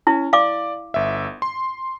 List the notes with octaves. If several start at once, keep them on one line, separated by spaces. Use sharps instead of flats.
C#4 E4
D5 F5 D6
G1 E5
C6